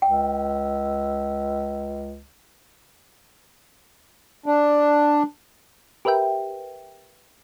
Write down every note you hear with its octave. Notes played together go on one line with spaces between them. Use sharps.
C#2 G5
D4
G4 A#4 B4 E5 G5